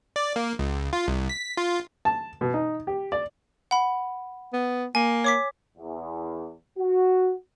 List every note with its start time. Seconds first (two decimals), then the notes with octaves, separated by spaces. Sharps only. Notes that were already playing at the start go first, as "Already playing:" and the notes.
0.16 D5
0.36 A#3
0.59 C#2
0.93 F4
1.08 C2
1.29 B6
1.57 F4
2.05 A5
2.41 B2
2.54 D#4
2.87 G4
3.12 D5
3.71 F#5 B5
4.53 B3
4.95 A#3 G#5
5.24 C#5 D6 B6
5.77 E2
6.78 F#4